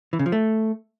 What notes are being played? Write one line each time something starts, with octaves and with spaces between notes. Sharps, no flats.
E3
C#3
F3
A3